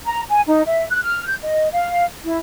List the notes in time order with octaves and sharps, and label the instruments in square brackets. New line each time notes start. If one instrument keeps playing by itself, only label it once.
[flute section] A#5
G#5
D#4
E5
F#6
F6
G6
D#5
F5
E4